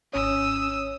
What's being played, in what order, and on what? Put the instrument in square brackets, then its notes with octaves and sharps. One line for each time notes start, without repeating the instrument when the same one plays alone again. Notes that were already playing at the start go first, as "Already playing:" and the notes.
[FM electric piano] G#1 C#5 [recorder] C#4 [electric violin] D#6 E6